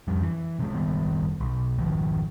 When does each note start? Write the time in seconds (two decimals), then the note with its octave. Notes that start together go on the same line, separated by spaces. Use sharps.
0.08 F2 G3
0.23 E3
0.59 C3 G#3
0.73 F#1 D#3 G3 B3
1.40 B1
1.78 G#1 D#3 F3